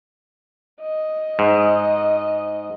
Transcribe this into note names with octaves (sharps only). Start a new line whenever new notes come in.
D#5
G#2